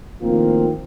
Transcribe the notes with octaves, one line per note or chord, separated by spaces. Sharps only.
A2 D#3 F3 A#3 C4 F4